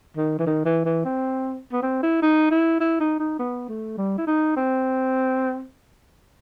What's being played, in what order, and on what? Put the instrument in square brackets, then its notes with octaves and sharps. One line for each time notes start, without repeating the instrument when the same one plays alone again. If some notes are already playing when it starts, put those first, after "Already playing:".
[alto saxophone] D#3
E3
D#3
E3
E3
C4
B3
C4
E4
D#4
E4
E4
D#4
D#4
B3
A3
G3
E4
D#4
C4